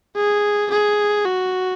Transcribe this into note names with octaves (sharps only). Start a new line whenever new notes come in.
G#4
G#4
F#4